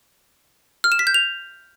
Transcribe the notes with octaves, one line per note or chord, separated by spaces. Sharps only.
F6
E7
B6
G6
F7